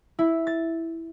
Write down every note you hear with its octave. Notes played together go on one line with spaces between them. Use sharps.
E4
A6